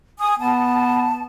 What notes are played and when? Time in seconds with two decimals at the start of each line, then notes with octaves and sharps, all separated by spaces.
0.19 G#5 D#6
0.39 B3 A5